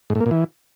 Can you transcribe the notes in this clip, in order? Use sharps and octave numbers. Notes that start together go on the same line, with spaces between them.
G#2
A2
A#3
A#2
E3